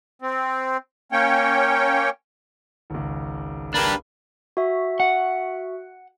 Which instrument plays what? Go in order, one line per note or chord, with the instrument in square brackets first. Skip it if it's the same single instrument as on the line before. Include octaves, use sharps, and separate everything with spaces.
[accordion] C4
A#3 C#4 C#5 G5
[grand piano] G#1 C#2
[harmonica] A#3 B4 [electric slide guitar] D4 G4
[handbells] F#4 E5
[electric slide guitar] F#5